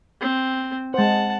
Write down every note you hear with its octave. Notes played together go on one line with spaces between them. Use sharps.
C4
G#3 C5 F#5 A5